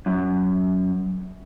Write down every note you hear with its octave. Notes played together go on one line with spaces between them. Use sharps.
F#2